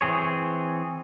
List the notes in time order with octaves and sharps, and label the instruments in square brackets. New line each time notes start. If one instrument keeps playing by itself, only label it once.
[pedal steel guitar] E3 C4 G#4 C#5